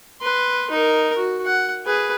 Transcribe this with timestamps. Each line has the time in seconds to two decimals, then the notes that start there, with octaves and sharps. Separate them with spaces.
0.21 B4 C6
0.71 D#4 A#4
1.17 F#4
1.45 F#5
1.86 G#4 B4